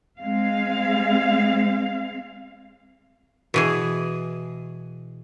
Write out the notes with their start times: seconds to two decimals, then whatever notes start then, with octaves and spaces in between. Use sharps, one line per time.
0.19 G#3 C4 F5
3.54 B2 E3 G#4